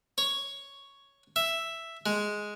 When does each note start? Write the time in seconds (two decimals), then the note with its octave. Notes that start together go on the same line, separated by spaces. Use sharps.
0.18 C#5
1.36 E5
2.06 G#3